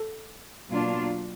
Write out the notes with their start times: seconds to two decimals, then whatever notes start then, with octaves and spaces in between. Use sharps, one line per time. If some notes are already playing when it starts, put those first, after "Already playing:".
Already playing: A4
0.70 B2 F#3 A#3 D4 F4